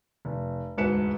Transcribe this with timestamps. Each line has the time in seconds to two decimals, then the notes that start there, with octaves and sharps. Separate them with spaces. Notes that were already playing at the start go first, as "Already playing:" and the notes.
0.25 F1
0.77 E1 D2 G#2 B4 C#7 E7